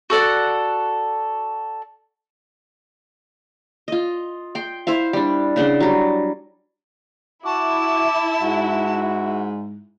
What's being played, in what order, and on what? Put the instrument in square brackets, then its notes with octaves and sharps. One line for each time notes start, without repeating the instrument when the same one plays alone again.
[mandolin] F#4 A4 D5 F#5
[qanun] F4 D#5
G5 C6
E4 C5 E5 F5
G3 D4
C#3 D4 F#5 C6
F#3 G3
[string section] E4 [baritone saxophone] F#4 [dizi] A5 [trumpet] D6
[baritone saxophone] G#2 [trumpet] F#4